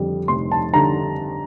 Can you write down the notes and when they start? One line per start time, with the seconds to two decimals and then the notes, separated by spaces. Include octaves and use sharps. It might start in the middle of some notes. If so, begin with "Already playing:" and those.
Already playing: F2 D3 G3
0.28 F1 C6
0.52 A5
0.74 D3 G3 A#5